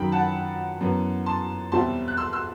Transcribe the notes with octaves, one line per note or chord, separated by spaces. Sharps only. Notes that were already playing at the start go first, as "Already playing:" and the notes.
Already playing: F#2 D#3 F#3 G5 B5
F#5 A5
F#2 E3 B3
A5 C6
E2 B2 G3 C4 E4 A5 C6
F#6
C6 E6
C6 E6